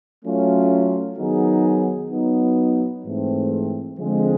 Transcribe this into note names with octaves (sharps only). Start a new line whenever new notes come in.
F#3 A3 C#4 F4
D#3 F#3 B3 D#4 G#4
F#3 B3 D#4
G#2 E3 A3 C4
D3 F3 G#3 C4